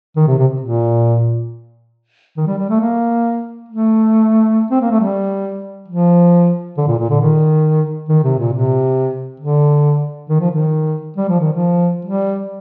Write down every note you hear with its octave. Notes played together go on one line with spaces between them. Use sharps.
D#3
C3
C3
A#2
D#3
G3
G3
A3
A#3
A3
C4
A#3
A3
G3
F3
D3
A#2
A#2
D3
D#3
D#3
C3
A#2
C3
D3
D#3
F3
D#3
G3
F3
D#3
F3
G3